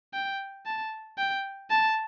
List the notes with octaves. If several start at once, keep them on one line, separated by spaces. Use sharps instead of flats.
G5
A5
G5
A5